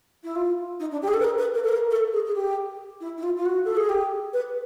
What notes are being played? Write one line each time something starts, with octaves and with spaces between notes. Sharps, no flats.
E4
F4
D#4
D4
G4
G#4
A4
B4
A#4
B4
A#4
A4
A#4
A4
G#4
G#4
G4
E4
E4
F4
F4
F#4
A4
G#4
G4
B4